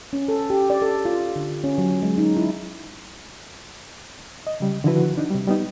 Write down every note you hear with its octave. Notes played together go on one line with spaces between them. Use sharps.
C#4
A4
G4
D5
A4
F4
D3
C#4
F#3
G#3
D#4
E4
D#5
C#3 G3
D3 D#3 F3 E4 F#4 B4
D4 D#4
C3 G3
G3 B3 D#4